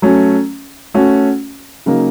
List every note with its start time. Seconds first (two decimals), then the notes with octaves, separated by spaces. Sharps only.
0.02 F#3 A3 C#4
0.94 A3 C#4 F#4
1.86 C#3 F#3 A#3 D#4 A#4